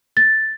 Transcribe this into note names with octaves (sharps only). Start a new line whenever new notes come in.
A6